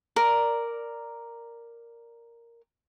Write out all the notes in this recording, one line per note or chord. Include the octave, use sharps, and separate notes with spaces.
A#4 D5